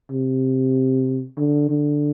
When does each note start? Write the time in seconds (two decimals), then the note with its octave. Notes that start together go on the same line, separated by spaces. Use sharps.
0.10 C3
1.37 D3
1.69 D3